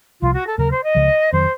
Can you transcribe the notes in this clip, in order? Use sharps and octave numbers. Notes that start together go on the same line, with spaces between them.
C2 C3 F3 F4
F#4
A4
D#2 C#3 F#3 A#4
C5
D#5
C#2 C#3 F3
F2 D#3 F#3 C5